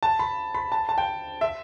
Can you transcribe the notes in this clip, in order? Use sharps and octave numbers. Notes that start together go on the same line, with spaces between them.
A5
B5
B5
A5
A5
G5
E5